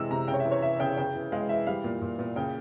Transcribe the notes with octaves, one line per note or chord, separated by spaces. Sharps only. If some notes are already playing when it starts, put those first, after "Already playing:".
Already playing: C3 E3 G#3 E6
C3 A#5
C#3 G5
C#5
E5
E3
C#5
E3 E5
C#3 G5
C#3 G5
E3
G#3 F5
E3 E5
G3 F5
A#2
A#2
A#2
C#3 G5